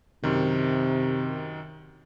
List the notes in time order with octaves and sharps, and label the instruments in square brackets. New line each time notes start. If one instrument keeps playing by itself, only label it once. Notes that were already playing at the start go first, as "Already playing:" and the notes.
[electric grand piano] F#2 D#3 [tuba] C3